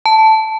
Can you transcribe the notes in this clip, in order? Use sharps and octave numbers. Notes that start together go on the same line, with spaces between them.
A5